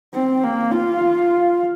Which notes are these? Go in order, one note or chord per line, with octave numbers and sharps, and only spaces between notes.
C4
A#3
F4